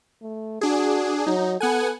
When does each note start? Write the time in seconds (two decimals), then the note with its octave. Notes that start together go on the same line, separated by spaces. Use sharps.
0.22 A3
0.61 D4 F#4 G#4
1.27 F#3 D#4
1.61 B3 A4 F#5 G#5